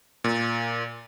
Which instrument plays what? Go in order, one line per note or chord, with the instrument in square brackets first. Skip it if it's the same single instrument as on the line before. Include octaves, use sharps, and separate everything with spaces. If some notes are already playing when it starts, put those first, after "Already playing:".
[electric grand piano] A#2